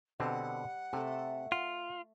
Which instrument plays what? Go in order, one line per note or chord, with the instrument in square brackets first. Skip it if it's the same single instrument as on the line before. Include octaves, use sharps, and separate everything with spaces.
[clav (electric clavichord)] B2 D3 C4 [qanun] G3 [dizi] F#5
[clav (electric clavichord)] C3 [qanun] A3 A4
[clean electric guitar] F4 [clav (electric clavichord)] F#5